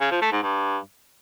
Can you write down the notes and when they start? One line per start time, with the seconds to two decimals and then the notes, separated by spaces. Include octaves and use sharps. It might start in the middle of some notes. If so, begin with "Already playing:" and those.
0.01 C#3
0.11 F3
0.22 A3
0.32 G#2
0.43 G2